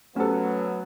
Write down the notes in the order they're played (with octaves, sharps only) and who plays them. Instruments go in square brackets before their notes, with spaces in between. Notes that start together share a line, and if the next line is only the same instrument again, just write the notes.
[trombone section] F#3 B3 [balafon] A3 G4 C5 [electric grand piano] C#4 A4